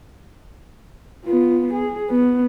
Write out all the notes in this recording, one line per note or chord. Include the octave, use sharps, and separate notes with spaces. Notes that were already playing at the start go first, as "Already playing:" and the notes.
B3 F4
G#4
B3